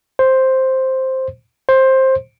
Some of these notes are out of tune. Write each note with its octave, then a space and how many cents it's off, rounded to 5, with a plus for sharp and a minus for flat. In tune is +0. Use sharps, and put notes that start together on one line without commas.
C5 +5
C5 +15